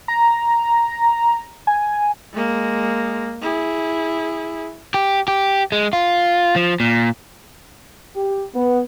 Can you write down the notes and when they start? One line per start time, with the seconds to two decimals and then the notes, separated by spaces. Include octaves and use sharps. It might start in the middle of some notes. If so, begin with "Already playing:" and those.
0.08 A#5
1.67 G#5
2.34 G#3 A#3
3.42 E4 G#4
4.94 G4
5.28 G4
5.72 G#3
5.93 F4
6.56 F3
6.80 A#2
8.16 G4
8.55 B3